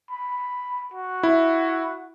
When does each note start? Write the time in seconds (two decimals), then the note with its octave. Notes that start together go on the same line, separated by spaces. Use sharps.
0.11 B5
0.94 F#4
1.23 E4